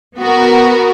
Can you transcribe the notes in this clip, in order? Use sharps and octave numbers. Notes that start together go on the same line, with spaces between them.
B3 F#4 A#4